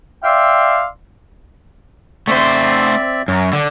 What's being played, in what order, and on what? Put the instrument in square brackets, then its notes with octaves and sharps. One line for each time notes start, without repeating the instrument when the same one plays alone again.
[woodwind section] D5 E5 F5 G5 C6 E6
[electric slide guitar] A3 C5 [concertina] C4 D5 E5
[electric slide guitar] F#2 [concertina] C#5
[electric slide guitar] D3